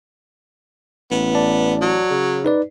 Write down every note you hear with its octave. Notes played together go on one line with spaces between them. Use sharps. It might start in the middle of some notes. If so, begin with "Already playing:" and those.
A1 B3
D5 A5
F#3
C#3
D#4 B4 D5